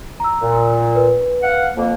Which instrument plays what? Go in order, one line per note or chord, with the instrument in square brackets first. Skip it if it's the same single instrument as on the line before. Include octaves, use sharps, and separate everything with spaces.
[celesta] A#5 E6
[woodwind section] A#2
[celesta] B4
[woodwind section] F5 F#5
F2 A#3